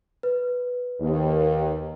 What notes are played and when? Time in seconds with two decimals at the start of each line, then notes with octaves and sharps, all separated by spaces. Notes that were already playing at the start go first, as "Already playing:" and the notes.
0.23 B4
1.01 D#2